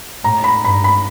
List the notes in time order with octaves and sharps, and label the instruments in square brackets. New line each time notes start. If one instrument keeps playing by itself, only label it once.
[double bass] A2 [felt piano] A#5
[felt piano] B5
[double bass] G2 [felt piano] B5
[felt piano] B5